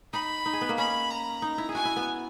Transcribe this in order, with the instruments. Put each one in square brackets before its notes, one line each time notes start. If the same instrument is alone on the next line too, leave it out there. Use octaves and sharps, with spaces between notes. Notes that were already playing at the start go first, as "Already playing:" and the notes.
[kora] D#4 [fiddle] B5
[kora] D#4
G#4
B3
A#3
[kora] C#4 [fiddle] B5
[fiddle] A#5
[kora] D#4
E4
G#4
[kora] F#4 [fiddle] G#5
[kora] E4
B3